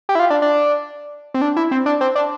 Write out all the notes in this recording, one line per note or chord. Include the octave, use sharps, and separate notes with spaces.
G4
E4
F4
D4
D4
C4
D4
E4
C4
D4
C4
D4